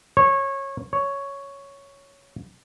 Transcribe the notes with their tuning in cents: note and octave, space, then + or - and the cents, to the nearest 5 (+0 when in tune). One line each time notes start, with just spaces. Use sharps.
C#5 -20
C#5 +5